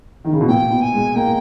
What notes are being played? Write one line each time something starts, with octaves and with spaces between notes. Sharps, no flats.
D#3
C#3
B2
A#2 G5
B2
G#5
G#3
A#3 G5